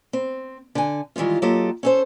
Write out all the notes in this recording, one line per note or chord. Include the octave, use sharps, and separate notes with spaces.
C4
D3 G#5
D#3 E3 G3 G#3 F4
F#3 A#3 F4 G4 A4 D#5
C#4 A4 C5